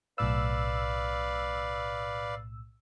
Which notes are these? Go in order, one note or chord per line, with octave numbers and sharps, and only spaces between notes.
B1 A2 B4 D5 F5 E6